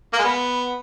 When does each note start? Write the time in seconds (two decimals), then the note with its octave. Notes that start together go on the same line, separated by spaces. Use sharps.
0.13 A#3
0.19 G#3
0.24 B3